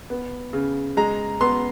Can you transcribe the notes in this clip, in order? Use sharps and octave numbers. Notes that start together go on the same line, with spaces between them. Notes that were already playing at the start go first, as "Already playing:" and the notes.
B3
C#3
G#3 A#5
B3 C6